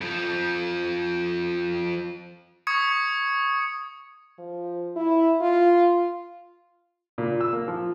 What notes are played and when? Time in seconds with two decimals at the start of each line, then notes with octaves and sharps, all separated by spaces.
0.01 F2 F3
2.67 C#6 D#6 G#6 C#7
4.39 F3
4.96 E4
5.41 F4
7.18 A#2
7.41 E6
7.53 A#3
7.68 F3